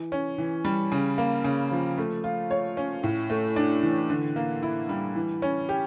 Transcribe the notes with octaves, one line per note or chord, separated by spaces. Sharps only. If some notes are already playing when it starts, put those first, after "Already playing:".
Already playing: E3
C#4
E3
G3
C#3
A#3
C#3
F3
A3
F4
C#5
C#4
A2
A3
D4
E3
D3
A#3
E4
G3
E3
C#4
G4